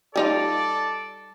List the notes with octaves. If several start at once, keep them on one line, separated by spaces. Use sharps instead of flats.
G3 D#4 F4 A4 D5